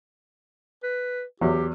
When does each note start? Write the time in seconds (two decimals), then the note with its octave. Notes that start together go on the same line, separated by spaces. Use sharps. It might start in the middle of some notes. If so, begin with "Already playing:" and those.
0.83 B4
1.41 E2 F#3 G4